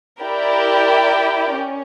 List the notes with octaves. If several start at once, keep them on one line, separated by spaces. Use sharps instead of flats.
E4 G4 A#4 D5 G5
C#4